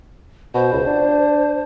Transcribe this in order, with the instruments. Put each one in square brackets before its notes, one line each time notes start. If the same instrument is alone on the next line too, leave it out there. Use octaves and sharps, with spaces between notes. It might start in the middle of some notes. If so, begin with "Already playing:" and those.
[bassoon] B2 [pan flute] C5
[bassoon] C#2
D4